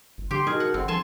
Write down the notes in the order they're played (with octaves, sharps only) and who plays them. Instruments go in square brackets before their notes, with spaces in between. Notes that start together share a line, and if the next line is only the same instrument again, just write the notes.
[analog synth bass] G#1
[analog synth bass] D3 [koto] G4 [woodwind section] C6
[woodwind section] B2 A#4 [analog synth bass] D#4 [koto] G#4
[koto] F#5
[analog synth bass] G#1 [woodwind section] D3 [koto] C4
[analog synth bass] F3 [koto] G#5 A5 [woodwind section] C6